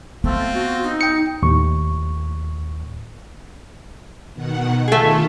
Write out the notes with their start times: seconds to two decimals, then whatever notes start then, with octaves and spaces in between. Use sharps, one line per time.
0.24 A3 B3 C4 F4
0.54 F#4
0.83 D#4
1.01 G5 C#7
1.42 D#2 A2 C#6
4.34 B2 D#3 F#5
4.88 D#3 A3 F4 G#4 A4